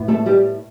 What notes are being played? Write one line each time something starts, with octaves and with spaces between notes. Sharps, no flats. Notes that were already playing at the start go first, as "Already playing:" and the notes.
Already playing: A2 B3
A3 A4
G3 G4